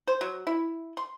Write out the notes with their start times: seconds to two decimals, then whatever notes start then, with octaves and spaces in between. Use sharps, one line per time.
0.08 C5
0.21 F#3
0.47 E4
0.97 C6